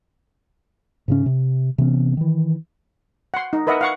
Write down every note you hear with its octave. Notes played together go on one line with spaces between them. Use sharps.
G#2 C#3 C#4
C3
C3 E3 B3 C#4
D#3 E3
F#5 C6
D#4
A#4 B4 D#5 E5 F#5
F5 F#5 C#6